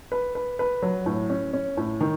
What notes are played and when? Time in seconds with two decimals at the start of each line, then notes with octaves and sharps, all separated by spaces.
0.12 B4
0.35 B4
0.59 B4
0.83 F#3
1.06 A2
1.30 C#4
1.53 C#4
1.77 A2
2.01 D#3